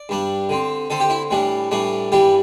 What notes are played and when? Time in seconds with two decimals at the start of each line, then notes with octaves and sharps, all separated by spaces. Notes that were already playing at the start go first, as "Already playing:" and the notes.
Already playing: D5
0.09 G2 G3 D4
0.49 D3 C4
0.90 D3 C4 A4
1.00 G4
1.10 E4
1.31 A2 E3 G3 D4
1.71 A2 E3 G3 D4
2.12 G2 E3 G3 G4